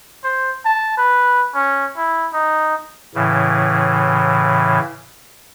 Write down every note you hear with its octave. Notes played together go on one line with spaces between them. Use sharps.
C5
A5
B4
C#4
E4
D#4
A2 C#3 E3